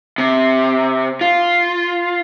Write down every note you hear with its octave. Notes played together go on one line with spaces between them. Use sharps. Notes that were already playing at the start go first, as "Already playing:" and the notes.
C3
F4